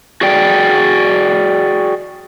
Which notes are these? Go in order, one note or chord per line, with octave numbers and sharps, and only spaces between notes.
F#4 G#4 D5 G5